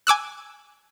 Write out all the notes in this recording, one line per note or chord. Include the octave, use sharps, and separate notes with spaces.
G#5 D6 E6 F#6